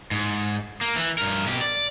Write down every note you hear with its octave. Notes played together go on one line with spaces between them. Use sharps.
G#2
A#3
E3
G2 A#4
B2 G4
D5